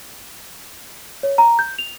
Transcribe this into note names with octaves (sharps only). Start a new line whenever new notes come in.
C#5
A#5
G6
F7